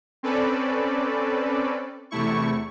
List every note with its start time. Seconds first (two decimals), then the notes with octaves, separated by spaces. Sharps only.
0.23 C4 C#4 A4 B4 D5
2.11 E2 C3 A3 E4 C#6